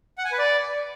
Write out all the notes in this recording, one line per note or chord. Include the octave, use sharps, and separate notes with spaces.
F#5
G#5
B4
D5